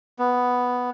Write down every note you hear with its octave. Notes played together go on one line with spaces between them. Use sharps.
B3